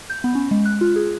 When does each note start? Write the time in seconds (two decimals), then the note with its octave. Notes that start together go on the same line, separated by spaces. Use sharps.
0.10 G6
0.24 B3
0.35 C#4
0.51 G#3
0.65 F#6
0.81 F4
0.96 G#4